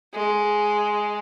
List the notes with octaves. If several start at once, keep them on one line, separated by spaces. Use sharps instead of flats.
G#3